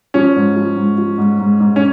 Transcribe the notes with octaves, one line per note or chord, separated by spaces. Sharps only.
F3 C#4
G#2
F3
G#2
F3
G#2
G#2
G#2
C#4